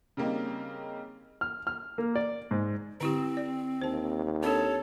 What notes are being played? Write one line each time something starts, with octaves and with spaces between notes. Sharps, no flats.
C#3 G3 A#3 C4 D#4
F6
F6
A#3
D5
G#2
D3 C4 E4 G4
D5
D#2 C5 A5
C4 D4 G4 A4 C#5